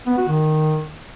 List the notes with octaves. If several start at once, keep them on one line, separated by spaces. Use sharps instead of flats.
B3
F#4
D#3